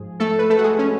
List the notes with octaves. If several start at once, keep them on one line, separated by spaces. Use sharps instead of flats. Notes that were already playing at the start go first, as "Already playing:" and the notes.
Already playing: G#2 F3 G#4
A3 A4
B4
A3 A4
F#4
G#3 G#4
C#4